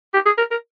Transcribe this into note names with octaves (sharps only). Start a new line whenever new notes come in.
G4
G#4
A#4
A#4